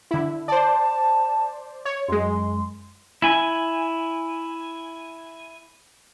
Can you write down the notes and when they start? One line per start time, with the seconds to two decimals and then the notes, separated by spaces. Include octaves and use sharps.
0.11 D3 E4
0.48 C5 D5 A5
1.85 C#5
2.08 F#2 G#3 C6
3.22 E4 G#5